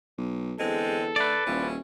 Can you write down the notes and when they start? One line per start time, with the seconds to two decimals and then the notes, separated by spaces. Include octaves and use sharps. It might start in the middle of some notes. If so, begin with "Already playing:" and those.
0.18 B1
0.60 E2 D3 G#3 C4 A4
1.16 D3 A3 B4 D5
1.47 D#1 F3 C#4 E4